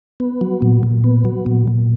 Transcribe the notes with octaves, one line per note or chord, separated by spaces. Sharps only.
B3
F#3
A#2
A#2
B3
F#3
A#2
A#2